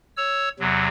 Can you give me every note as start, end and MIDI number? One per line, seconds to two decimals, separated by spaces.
0.17 0.49 73
0.17 0.49 88
0.60 0.88 40
0.60 0.88 48
0.60 0.88 54